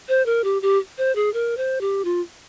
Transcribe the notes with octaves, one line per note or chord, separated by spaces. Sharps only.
C5
A#4
G4
G4
C5
G#4
A#4
C5
G4
F4